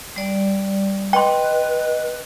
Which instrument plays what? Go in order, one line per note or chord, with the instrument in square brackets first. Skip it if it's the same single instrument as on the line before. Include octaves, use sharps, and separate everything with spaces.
[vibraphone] G3 D5
[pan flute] B4 [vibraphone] D#5 [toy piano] G5 C6